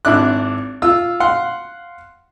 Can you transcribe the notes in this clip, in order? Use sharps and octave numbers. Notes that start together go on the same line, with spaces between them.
G#1 D4 E4 D5 F#6
F4 E6
F5 F#5 C6